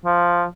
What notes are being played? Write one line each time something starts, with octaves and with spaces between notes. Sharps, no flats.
F3